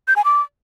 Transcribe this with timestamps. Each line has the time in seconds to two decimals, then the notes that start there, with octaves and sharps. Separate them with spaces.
0.08 G6
0.16 G#5
0.25 D6